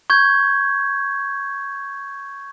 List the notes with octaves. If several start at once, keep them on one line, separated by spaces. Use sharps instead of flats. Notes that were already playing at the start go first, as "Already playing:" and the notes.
C#6 G6 G#6